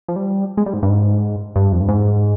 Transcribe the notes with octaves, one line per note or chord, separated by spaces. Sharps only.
F3
G3
G#3
G3
G#2
G2
G#2
G2
F2
G2
G#2